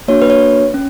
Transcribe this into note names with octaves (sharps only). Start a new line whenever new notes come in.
A#3 D4 F#4 C#5
B4
C#5
C#4